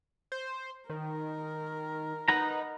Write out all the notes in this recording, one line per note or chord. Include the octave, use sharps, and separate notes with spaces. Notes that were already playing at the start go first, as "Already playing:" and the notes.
C5
D#3 A#4
D#4 B4 F#5 A#5